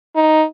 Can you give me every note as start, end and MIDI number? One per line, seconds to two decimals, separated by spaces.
0.16 0.44 63